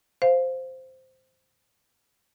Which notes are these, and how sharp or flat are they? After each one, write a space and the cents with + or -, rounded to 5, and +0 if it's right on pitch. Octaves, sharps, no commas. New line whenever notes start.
C5 -5 F5 +0